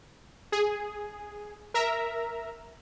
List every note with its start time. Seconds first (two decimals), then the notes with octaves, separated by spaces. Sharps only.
0.52 G#4
1.74 A#4 E5 A#5